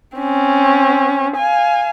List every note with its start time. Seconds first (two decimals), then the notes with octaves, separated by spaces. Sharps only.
0.17 C4 C#4
1.37 F5 G#5